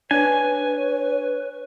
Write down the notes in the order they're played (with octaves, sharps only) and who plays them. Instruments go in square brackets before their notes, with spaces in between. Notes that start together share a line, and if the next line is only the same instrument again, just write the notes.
[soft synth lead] D4 [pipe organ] B4 [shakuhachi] C#5 [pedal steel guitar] G#5